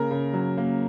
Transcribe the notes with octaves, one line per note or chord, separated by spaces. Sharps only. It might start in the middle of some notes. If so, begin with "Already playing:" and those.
Already playing: C#3 A#3 A#4
C#3
F#3
A#3